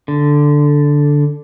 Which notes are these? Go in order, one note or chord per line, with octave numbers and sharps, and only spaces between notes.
D3